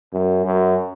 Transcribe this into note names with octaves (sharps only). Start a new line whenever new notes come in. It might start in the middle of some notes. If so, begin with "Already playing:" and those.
F#2
F#2